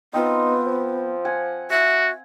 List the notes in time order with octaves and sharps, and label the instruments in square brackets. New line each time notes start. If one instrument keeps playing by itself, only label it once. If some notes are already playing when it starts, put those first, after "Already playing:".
[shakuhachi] B3 [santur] C4 F4 C5 [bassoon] D#4
[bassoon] F3
[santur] F#5 G#5
[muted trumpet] F#4 [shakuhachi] E5